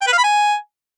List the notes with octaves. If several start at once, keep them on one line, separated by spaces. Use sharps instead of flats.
G5
B4
F5
B5
G#5